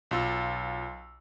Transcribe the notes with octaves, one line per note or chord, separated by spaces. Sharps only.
B1 F4 E6